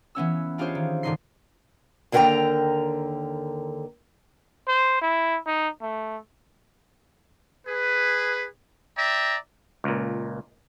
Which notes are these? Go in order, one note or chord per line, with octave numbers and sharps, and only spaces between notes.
E3 B3 C#4 E6
D4 F4 G4 G#4 C5 C#5
D#3
G#2 D3 D#3 D#4 C6 C7
D#2 D3 A#4 B4 G5 A#5
C5
E4
D#4
A3
G#4 B4
D5 E5 G5 A#5
C#2 A#2